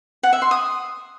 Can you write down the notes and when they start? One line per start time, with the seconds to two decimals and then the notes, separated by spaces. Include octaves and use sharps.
0.23 F#5
0.33 E5
0.42 C6
0.51 D#6